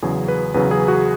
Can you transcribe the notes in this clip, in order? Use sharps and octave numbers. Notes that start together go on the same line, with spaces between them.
E2 C#3 F#3 G#4
B4
E2 C#3 F#3 B4
G#4
F#4